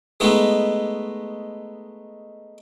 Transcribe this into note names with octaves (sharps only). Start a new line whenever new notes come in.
G#3 A3 B3 D#4 A4